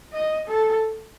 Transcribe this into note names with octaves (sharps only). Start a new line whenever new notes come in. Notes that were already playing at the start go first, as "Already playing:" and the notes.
D#5
A4